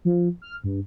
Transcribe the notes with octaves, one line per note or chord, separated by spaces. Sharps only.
F3
F6
G2